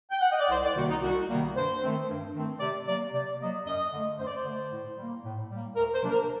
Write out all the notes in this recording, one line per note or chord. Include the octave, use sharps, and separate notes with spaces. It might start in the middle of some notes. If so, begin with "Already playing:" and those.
G5
F#5
D#5
D5
C2 C5
D5
C3 D#3 G3 A#3 F#4
D#4
C2 F#4
C3 D#3 G3 A#3
G2 C5
D#3 A3 C4
G2
D#3 A3 C4
C3 D5
F#3 A#3 D5
C3 D5
F#3 A#3 D#5
F#2 D#5
D3 A3
F#2 C5
D5
C5
D3 A3
A2
G3 A#3
A2
G3 A#3
D2 A#4
C5
C3 F#3 A#3 D4
A#4